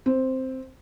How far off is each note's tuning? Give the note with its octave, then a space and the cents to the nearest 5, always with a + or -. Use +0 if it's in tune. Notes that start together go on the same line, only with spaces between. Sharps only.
C4 +0